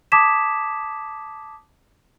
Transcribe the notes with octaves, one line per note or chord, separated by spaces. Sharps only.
A5 D6 D#6 G#6 B6 E7